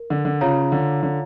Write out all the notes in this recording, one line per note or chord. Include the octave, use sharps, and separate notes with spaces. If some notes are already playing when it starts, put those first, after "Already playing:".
Already playing: A#4
D3
D3
C#3 F4 C#5 F5 A#5
D3
D3